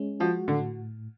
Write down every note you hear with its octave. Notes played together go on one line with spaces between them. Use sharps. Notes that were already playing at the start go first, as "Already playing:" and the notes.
Already playing: G#3 C#4
F3 F#4
A2 D3